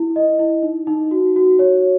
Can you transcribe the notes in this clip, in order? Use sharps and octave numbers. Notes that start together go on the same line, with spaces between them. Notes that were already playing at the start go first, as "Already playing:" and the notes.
Already playing: E4
D#5
E4
D#4
D#4
F#4
F#4
C#5